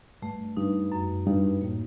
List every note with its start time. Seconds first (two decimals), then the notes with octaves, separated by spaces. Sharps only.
0.22 G2 A3
0.57 G2 D#4
0.92 F#2
1.27 G2 D#4
1.61 A2 A#3